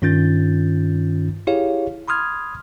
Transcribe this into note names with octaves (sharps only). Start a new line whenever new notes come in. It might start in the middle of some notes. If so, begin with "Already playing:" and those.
G2 D#3 C#4 F4 G6 A6
E4 G4 G#4 C#5 F5
B5 C6 D#6 F6 G#6